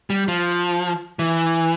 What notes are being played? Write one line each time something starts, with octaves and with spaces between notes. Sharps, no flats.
G3
F3
E3